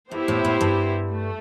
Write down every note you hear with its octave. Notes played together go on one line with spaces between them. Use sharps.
G2 B3 E4 G4 C5
A2
A2
G2
A3